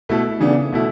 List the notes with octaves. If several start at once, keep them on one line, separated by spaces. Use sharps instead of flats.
B2 A3 E4 A4
C#3 E3 B3 D4
B2 A3 E4